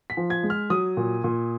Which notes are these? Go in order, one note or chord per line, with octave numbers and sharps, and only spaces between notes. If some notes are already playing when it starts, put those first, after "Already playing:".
B6
F3
G#6
G#3
F6
F#3 D#6
A#2
A#2